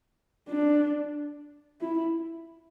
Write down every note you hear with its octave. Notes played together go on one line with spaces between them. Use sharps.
D4
E4